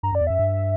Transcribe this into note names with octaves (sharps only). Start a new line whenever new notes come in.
G2 A#5
F#2 D5
E2
F#2 E5
G2